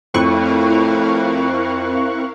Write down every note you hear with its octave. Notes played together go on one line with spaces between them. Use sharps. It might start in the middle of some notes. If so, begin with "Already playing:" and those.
F2 A2 C4 E4 A#4 F5 C#6 F#6